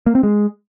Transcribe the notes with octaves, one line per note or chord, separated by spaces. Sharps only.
A#3
C4
G#3